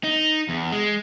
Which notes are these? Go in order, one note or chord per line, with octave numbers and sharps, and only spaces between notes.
D#4
E2
G#3